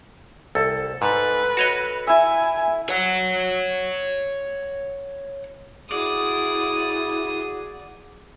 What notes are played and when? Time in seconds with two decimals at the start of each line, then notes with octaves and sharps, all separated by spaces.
0.55 C2 A4
1.02 G#2 B4
1.57 F#4 C#5 D#5
2.07 E4 E5 G#5
2.89 C#5 F#5
5.92 E4 F#4 G#4 D5 D#6